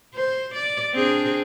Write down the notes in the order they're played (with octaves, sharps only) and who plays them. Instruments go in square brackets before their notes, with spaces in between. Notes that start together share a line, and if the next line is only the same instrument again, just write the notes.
[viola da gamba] C5
D5
C4 D4 G#4